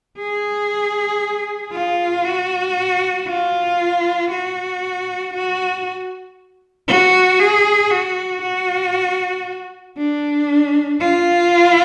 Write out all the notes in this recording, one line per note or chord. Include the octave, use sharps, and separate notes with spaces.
G#4
F4
F#4
F4
F#4
F#4
F#4
G#4
F#4
F#4
D4
F4